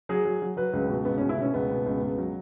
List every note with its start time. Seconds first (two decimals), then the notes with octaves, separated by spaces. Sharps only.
0.09 F#3 G#4
0.25 F#3
0.42 F#3
0.57 F#3 B4
0.73 C#2
0.89 B2
1.05 C#2 B3
1.18 C#4
1.21 B2
1.29 E4
1.38 B2 C#4
1.54 C#2 B3
1.70 B2
1.86 C#2
2.02 C#2
2.18 F#3